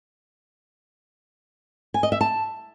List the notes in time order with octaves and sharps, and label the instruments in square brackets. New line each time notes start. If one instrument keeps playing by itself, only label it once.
[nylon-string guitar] G#5
D#5
E5
A5